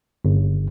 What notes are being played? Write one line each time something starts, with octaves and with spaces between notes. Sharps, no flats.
G1